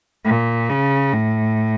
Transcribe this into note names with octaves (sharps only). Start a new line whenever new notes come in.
A#2
C#3
A2